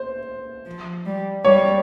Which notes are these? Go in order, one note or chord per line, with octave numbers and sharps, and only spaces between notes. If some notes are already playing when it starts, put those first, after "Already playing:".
Already playing: C5
F3
G3
G3 C#5